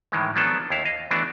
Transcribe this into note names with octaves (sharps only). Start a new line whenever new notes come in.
A2 D#3 E3 G#3
F3 F#3 B3 D4 A4
D#2 E4 F5
D#5 F5
E3 A3 B3 D4 F#4